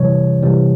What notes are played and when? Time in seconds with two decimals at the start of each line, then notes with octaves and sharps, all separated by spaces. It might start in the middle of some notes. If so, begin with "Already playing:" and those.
Already playing: C3 E3 G3 C#5
0.43 C3 E3 G3